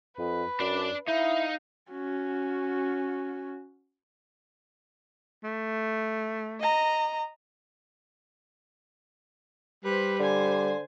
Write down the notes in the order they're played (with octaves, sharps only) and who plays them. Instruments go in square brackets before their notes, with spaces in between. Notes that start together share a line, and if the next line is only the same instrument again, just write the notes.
[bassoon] F2 [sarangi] B4
[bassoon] F#2 [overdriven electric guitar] D4 D5
[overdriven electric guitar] D#4 [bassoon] E4 [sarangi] F5
[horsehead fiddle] C#4 F#4
[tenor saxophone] A3
[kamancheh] D#5 A#5
[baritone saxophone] G3 [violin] B4 C5
[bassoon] D3 [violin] C5 G#5